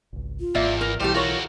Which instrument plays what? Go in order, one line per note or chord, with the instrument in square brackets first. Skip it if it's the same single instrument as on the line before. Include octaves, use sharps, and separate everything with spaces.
[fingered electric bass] G#1 C#2
[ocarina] F4
[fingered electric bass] G#1 G#2 [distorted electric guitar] E2 [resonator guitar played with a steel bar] A#3 D5 E5
[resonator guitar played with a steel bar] A#4
[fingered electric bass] B1 B2 E3 [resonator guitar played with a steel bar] G3 A3 G4 [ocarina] E4 [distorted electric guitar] C5
[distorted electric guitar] A3 F#4 [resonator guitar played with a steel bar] F4 A#4 C#5